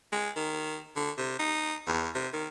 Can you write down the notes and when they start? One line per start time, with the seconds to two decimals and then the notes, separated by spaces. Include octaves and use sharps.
0.12 G#3
0.36 D#3
0.96 D3
1.18 C3
1.39 D#4
1.86 E2
2.15 C3
2.33 D#3